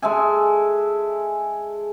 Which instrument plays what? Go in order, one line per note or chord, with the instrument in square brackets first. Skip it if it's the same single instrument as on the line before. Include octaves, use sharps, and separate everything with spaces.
[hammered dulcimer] G#3 A4 E5 G#5